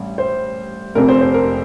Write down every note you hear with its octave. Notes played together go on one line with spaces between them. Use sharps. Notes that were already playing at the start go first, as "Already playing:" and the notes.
Already playing: A1 G3
C5
F1 F2 C3 A#4
C5
C5
A#4